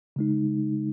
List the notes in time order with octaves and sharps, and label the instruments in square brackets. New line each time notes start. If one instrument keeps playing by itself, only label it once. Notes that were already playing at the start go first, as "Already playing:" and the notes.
[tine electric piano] C#3 G#3 D#4